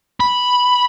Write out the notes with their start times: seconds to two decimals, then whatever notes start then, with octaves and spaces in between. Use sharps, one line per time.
0.20 B5